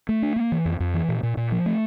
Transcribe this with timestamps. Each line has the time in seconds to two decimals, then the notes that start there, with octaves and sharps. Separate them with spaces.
0.09 A3
0.22 D4
0.36 A#3
0.52 E3
0.65 F2
0.80 F2
0.94 E3
1.09 A#2
1.23 A#2
1.37 A#2
1.52 F3
1.66 A3